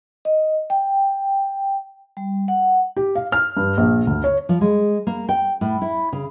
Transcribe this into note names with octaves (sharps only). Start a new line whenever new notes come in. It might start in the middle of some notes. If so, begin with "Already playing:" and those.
D#5
G5
G3
F#5
G4
F5
F6
G2
A#1
D2
C#5
F3
G#3
A#3
G5
A2
E4
C#3